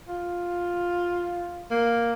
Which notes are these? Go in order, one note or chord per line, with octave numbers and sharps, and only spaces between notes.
F4
A#3